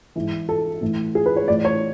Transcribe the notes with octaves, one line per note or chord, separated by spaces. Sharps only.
G#2 E3
A4
A2 E3
G#4
B4
C#5
A2 E3 D5
C#5